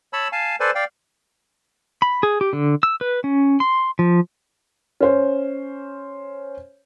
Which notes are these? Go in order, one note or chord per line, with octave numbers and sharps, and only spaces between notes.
C#5 A5 B5 E6
F5 G#5 A5
A4 B4 C5 D5 G#5
D5 F5 G5
B5
G#4
G4
D3
E6
B4
C#4
C6
F3
C#4 C5 C#5